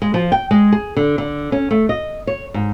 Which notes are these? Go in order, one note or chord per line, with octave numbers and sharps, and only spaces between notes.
G#3
F3
G5
G#3
G#4
D3
D3
C#4
A3
D#5
C#5
G#2